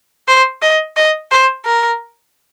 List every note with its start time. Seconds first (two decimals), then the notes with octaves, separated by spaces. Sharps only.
0.28 C5
0.62 D#5
0.96 D#5
1.31 C5
1.65 A#4